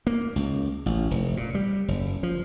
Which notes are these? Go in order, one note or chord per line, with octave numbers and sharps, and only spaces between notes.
A#3
C#2
A1
F1
A#2
G3
F#1
F3